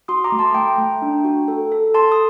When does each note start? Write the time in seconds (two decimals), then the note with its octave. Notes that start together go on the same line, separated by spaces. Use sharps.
0.08 F#4 C6 D#6
0.24 A#5 D6
0.32 A3
0.39 A5 C6
0.55 A3 G5 A#5
0.78 A3
1.02 D4
1.25 F#4
1.48 A4
1.72 A4
1.94 A4 A5 C6
2.12 D#6